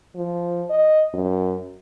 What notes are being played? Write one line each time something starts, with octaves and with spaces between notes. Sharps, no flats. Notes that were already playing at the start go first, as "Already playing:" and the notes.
F3
D#5
F#2